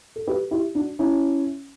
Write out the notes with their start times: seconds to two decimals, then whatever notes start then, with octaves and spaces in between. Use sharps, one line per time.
0.16 A4
0.27 G4 B4
0.51 E4 G4
0.75 D4 F#4
0.99 C#4 E4